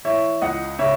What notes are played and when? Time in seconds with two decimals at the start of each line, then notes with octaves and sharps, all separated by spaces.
0.05 E3 C#5 E5
0.42 C#2 D#5 F#5
0.79 C#3 C#5 E5